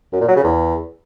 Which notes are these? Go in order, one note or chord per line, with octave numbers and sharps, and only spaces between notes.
F#2
A#2
F#3
C#3
E2